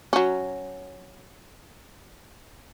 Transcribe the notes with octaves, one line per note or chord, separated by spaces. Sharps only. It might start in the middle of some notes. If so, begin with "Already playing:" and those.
F#3 C#4